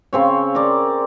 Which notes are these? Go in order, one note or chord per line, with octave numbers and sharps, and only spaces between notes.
C#3 C4 C#5
A#4 D5